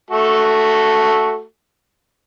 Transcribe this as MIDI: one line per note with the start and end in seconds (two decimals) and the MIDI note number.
0.11 1.42 57
0.11 1.42 66
0.11 1.42 69